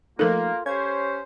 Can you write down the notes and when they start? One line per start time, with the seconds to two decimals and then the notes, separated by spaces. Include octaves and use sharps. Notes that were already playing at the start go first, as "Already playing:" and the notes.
0.19 F3 A3 A#3 D#4 F4 A4 A#4
0.66 C#4 G4 C5 C#5 G#6